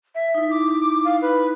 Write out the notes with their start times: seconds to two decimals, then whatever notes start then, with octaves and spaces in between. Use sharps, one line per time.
0.15 E5
0.35 D#4 E4
0.50 D6
1.05 F5
1.21 B4